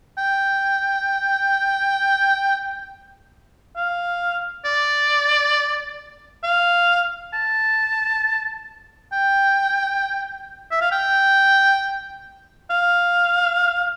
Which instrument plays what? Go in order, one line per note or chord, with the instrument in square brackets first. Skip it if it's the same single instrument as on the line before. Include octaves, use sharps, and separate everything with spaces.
[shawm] G5
F5
D5
F5
A5
G5
E5
F5
G5
F5